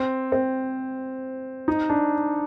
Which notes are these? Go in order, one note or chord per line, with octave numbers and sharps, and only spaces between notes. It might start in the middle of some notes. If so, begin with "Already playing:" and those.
Already playing: C4
C4
D#4
D4